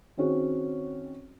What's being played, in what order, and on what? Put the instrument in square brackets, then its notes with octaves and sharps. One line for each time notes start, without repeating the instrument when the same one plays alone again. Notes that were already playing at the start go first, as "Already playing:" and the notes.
[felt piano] D#3 C4 C#4 F#4 G#4